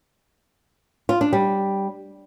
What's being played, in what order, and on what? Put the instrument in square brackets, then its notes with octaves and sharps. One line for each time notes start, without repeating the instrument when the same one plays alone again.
[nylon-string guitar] F4
D4
G3